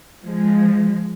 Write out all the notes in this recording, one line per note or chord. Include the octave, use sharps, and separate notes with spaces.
F3 G#3